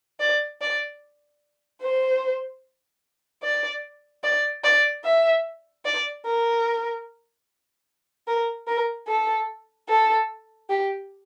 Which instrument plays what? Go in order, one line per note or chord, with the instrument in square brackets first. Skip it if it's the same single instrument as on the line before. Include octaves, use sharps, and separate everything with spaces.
[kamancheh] D5
D5
C5
D5
D5
D5
E5
D5
A#4
A#4
A#4
A4
A4
G4